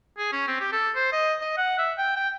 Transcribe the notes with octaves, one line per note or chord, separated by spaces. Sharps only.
G#4
C#4
C4
G4
A4
C5
D#5
D#5
F#5
E5
G5
G5